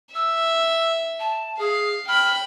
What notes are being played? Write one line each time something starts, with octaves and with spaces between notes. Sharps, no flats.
E5 E6
A5
G#4 F5
G5 B5 F6